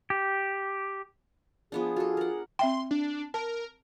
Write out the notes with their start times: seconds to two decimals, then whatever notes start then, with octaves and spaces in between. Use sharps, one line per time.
0.10 G4
1.72 F3 B3 D4 G#4
1.96 F4 F#4 A4
2.17 A#4 F#5
2.59 C4 E5 G5 C6
2.91 D4
3.34 A#4 A5